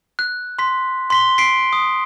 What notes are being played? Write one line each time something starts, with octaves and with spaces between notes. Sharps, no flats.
F#6
C6 B6
C6 B6 G7
B6 C7 D7
D#6